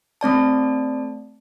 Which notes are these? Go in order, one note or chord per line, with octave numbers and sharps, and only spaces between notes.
A3 C4 D5 A5